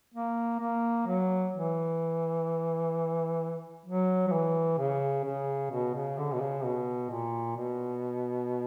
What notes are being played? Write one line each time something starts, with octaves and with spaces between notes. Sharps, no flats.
A#3
A#3
F#3
E3
F#3
F#3
E3
C#3
C#3
B2
C#3
D3
B2
C#3
B2
A#2
B2